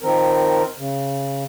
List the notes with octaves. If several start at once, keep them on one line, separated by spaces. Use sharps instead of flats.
D#3 F3 C4 A#4
C#3